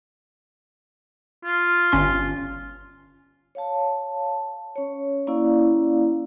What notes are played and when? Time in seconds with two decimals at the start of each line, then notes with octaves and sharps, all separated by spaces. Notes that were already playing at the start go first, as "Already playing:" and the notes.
1.44 F4
1.92 G1 C#4 C6
3.55 C#5 F5 A5
4.76 C#4 C#5
5.27 A#3 C#4 E4 D5 F5